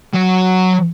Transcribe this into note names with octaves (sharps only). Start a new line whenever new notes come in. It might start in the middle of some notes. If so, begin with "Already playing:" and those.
F#3 C#5